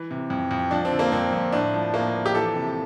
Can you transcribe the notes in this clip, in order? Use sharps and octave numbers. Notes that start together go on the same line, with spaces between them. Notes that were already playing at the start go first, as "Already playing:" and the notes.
Already playing: E3
C3
F2
F2
F3 D4
C4
D3
A#3
F2 C4
F2
A2 D4
F3
A2 A#3
F3
G4
E3 A4
C3